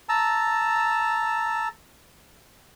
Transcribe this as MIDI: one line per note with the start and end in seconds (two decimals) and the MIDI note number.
0.09 1.68 81
0.09 1.68 82
0.09 1.68 88